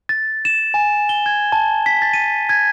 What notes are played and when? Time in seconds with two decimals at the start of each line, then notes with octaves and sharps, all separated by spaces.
0.09 A6
0.45 E7
0.74 G#5
1.09 G7
1.26 G#6
1.52 A5
1.86 B6
2.02 A6
2.14 D#7
2.49 G#6